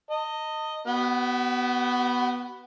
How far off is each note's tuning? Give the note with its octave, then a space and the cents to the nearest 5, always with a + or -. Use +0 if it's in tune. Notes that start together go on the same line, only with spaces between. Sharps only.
D#5 +0 A5 +40
B3 +0 F#4 +40